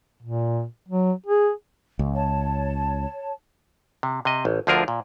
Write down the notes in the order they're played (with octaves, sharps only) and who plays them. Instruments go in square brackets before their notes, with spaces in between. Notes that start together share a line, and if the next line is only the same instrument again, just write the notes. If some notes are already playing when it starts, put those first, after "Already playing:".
[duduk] A#2
F#3
G#4
[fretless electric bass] C#2
[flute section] C#5 A5
[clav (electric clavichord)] C3
C3 D#5
A1
D2 D3 F3 F4 G#4 A#4
A#2